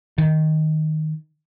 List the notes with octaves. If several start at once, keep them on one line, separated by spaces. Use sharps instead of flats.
D#3